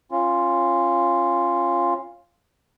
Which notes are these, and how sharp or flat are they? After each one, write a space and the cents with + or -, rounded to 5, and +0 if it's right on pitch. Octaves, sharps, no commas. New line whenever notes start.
C#4 -25 F4 -5